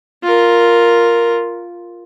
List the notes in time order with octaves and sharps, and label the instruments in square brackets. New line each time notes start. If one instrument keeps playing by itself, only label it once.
[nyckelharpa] F4 A#4